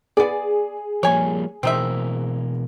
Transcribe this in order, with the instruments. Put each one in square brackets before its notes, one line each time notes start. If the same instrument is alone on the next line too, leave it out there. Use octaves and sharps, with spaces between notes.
[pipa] B3 D5 [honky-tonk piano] G#4
[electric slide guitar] F3 G3 A#3 [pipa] C#5 G#5
[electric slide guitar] B2 E3 A#4 [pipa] C4 D#4 E5